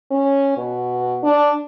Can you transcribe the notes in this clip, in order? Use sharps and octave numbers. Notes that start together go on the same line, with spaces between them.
C#4
B2
D4